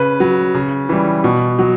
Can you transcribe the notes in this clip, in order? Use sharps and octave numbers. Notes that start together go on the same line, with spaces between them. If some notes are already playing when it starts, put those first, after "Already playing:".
Already playing: C#3 B4
F#3
C#3
E3 G3
B2
F#3